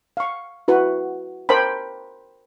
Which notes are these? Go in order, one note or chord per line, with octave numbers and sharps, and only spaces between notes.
F5 C#6
E4 F#4 B4
A#4 C5 G5 A5 B5